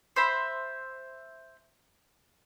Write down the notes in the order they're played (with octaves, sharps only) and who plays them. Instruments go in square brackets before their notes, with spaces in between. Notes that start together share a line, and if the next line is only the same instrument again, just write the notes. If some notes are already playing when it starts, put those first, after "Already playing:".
[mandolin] C5 E5 B5